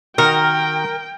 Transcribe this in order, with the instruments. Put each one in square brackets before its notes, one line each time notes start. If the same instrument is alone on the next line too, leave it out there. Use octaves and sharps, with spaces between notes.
[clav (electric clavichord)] D#3 D#4 F#4 [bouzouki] A#4 [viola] G5